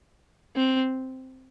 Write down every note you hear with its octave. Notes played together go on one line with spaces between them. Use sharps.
C4